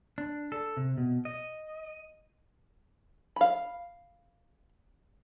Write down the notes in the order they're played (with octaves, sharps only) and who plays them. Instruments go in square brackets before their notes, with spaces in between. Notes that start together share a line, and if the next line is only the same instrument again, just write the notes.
[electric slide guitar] D4
A4
C3
B2
D#5
[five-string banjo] F5 B5